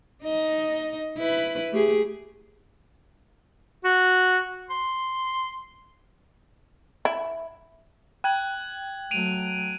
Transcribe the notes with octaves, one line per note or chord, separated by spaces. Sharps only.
D#4 D#5
E4 B4
A3 G4 G#4
F#4
C6
E4
G5 F#6 G#6 F#7
F#3 A3 D7 D#7 F7